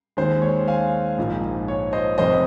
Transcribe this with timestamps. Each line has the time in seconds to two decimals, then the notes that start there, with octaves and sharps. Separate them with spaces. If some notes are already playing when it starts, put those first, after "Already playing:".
0.17 D#2 D#3 G#3 C5
0.42 C#5
0.68 F5 G#5
1.18 A#1 G#2 F3 A#3
1.68 C#5
1.93 C5 D#5
2.18 F1 F2 C3 C5 D#5